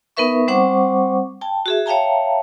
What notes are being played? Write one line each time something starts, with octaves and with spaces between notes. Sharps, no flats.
B3 D#4 A#4 B4 E5 C#6
G3 C4 C5 F#5 C#6 D6
G5 A5
F#4 G#4 E5
C#5 E5 F5 G5 A5 A#5